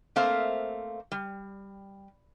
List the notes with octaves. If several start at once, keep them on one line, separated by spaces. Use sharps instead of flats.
A3 A#3 C4 C5 E5 F5
G3